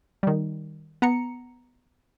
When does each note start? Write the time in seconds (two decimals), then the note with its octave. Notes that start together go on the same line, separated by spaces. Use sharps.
0.23 D#3 G3
1.02 B3 A#5 C#7